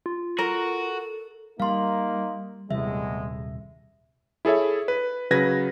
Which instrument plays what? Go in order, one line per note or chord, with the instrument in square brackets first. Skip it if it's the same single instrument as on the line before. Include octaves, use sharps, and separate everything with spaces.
[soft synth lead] F4
[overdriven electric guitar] F#4 [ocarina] A4 [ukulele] A#4
[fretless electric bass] G3 [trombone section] A#3 D#4 [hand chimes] F5 C6
[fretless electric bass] D#1 C3 G3 [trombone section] E2 A2 G#3 [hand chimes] E5
[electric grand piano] E4 G#4 A4 C#5 E5
B4
C#3 F#3 B4 G#6 A#6